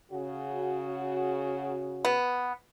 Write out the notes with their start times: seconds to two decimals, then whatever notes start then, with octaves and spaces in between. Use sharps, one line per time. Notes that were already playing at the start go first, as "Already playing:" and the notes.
0.11 C#3 F#4
2.05 B3